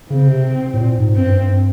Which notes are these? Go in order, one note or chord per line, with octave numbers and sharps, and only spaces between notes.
C#3 C4
C3
A2
A#2
G#2
G2 C4
F#2
G2